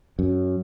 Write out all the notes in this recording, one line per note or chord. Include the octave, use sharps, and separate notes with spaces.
F#2